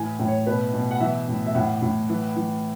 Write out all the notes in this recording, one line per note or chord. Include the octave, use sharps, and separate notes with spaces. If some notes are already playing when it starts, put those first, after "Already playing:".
Already playing: A2 E3 G#5
A2
C#5
B2 B4
B2
F#5
E3 E5
A2
E5
A2 F#5
A2
E3
E3